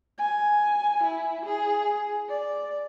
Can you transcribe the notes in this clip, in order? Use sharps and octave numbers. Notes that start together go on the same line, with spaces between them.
G#5
E4
G#4
D5